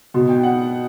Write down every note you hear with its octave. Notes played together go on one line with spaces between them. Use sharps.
B2
G5
F#5